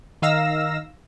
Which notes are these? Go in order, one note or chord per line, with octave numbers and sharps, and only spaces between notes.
D#3 D#4 F5 E6 A#6